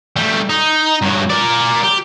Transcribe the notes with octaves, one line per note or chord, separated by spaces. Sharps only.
G3 A3
D#4
G2 F#3
A#4 D5
G4